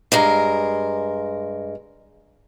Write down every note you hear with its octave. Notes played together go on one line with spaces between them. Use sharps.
G2 G#3 A#4